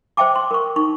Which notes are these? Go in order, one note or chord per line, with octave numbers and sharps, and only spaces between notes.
C5 D5 E5 G5 A5 D6
C6
A#4 C#6
D#4 C#6